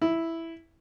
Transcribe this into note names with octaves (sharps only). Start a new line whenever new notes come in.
E4